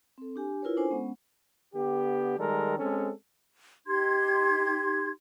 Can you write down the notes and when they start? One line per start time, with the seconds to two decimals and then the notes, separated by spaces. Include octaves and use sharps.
0.18 C4 A4
0.36 D4 G4 G#5
0.62 E4 F4 A#4 B4 C#5
0.77 C#4 D4 A4 C5 G#5
0.91 G#3 B3 C#4 F#5
1.74 D3 B3 G4
2.38 D#3 G3 G#3 A4 A#4
2.78 G#3 C4 C#4 A4
3.87 D#4 G4 C6 G#6